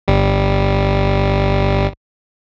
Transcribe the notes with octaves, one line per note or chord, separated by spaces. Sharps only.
G1 G3